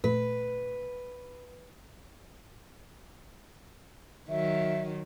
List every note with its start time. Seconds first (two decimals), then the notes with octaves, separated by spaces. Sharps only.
0.04 A#2 A3 B4
4.29 D#3 F#3 E5